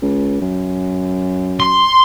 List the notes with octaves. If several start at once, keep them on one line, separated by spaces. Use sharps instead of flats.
C#2
F#2
C6